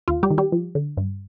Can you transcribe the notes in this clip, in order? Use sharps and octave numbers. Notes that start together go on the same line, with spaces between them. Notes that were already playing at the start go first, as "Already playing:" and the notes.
D#2 F4
G3 G4
D#3
G3 G4
F3
D3
G2